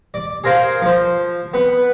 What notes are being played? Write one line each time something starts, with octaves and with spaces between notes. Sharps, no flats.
D5
G#4 A#4 C5 F5
F3 C5
B3 B4